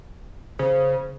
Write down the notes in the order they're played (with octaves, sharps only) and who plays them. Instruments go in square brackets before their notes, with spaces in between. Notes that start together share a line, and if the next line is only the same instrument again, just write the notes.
[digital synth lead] C#3 [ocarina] C5